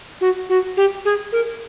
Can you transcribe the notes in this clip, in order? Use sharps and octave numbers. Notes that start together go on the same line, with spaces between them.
F#4
F#4
G4
G#4
A#4